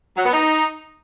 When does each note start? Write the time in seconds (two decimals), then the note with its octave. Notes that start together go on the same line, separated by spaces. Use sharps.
0.17 F#3
0.25 B3
0.32 D#4